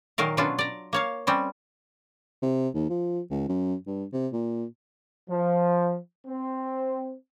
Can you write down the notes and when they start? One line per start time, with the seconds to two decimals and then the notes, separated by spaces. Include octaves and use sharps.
0.18 A#2 D#3 F#3 A#4 F5
0.37 B2 F#3 C#4 D4 F4 B4
0.59 D5 A#5
0.93 A#3 C#5 F5
1.27 G3 C4 C#4
2.42 C3
2.74 D#2
2.90 F3
3.31 C#2
3.49 F#2
3.87 G2
4.13 C3
4.33 A#2
5.28 F3
6.26 C4